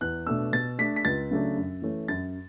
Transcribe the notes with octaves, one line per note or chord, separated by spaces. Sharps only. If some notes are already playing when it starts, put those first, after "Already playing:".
E2 F#6
B2 A3 D4 E6
B2 A6
A3 D4 B6
B6
C#2 A6
C#3 F#3 A3 D4
F#2
E3 A3 C#4
F#2 A6